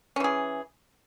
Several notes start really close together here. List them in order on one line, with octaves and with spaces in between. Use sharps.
C#4 E3 G#4